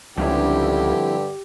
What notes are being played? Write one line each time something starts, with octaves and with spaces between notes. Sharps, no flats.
C#2 G2 D3 F3 C4 E4 G4